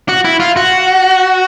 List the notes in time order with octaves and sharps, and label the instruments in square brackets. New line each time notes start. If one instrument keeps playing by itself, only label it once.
[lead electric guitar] F#4
E4
F4
F#4